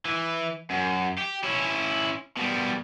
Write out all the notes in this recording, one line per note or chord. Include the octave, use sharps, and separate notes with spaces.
E3
F#2
G4
C#4 E4
B2 G3